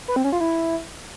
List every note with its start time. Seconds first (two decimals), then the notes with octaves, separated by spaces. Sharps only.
0.08 B4
0.16 C4
0.24 C#4
0.32 F4
0.41 E4